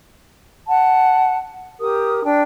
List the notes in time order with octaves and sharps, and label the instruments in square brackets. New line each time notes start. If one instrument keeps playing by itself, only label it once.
[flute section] F#5 A5
G4 A#4 D#6
D4 G5